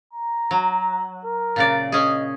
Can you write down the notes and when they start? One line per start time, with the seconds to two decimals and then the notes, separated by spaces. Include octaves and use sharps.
0.13 A#5
0.51 F#3
1.25 A#4
1.56 A#2 C#3 D5
1.92 C#4 G#4 D#5